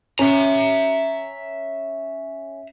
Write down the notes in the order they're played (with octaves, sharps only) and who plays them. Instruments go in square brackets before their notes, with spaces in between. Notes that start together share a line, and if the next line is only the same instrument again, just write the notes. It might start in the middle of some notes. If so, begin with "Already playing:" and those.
[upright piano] C#4 [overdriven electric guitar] E5 A#5